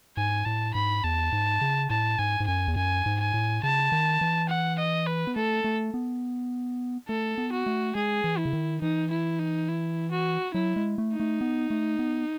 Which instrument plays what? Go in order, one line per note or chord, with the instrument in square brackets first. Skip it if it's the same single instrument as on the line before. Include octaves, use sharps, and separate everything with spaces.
[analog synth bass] G#2 [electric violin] G#5
[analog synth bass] A2 [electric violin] A5
[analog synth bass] G#2 [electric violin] B5
[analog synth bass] E2 [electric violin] A5
[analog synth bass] G#2
C#3
[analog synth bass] A2 [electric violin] A5
[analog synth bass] G#2 [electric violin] G#5
[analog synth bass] G#2
[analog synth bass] F#2 [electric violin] G#5
[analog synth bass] E2
[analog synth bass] F#2 [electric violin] G#5
[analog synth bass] G#2
[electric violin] G#5
[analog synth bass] A2
[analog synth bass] C#3 [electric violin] A5
[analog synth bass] D#3
E3
[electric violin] F#5
D#5
B4
[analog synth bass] B3
[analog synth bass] A3 [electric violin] A4
[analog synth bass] A3
B3
[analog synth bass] A3 [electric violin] A4
[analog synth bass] B3
[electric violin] F#4
[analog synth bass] A3
[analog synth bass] G#3 [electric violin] G#4
[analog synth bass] E3
[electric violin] E4
[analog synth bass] C#3
D#3
[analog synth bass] E3 [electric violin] D#4
[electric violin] E4
D#4
E4
F#4
[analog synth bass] F#3 [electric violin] E4
[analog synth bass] G#3
A3
[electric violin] D#4
[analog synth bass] A3
B3
A3
B3